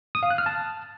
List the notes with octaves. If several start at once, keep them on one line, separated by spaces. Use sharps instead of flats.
D#6
F5
F#6
F6
A5